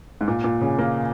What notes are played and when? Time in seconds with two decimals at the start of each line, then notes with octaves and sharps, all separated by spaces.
0.21 G#2
0.28 A#2
0.44 A#2
0.61 C#3
0.79 A#3